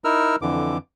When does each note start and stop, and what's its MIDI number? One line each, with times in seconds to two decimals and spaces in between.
0.04 0.36 63
0.04 0.36 64
0.04 0.36 70
0.04 0.36 88
0.04 0.36 89
0.42 0.78 41
0.42 0.78 50
0.42 0.78 52
0.42 0.78 86